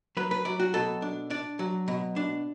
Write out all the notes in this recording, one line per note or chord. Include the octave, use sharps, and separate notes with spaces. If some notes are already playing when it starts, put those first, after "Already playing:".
F#3 B4
B4
F#3 D5
F#4
B2 A4
D4
D4 D5
F#3
B2
D4